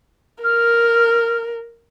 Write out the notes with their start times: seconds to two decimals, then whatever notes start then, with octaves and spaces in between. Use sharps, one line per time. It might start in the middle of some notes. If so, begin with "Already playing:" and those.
0.43 A#4 F6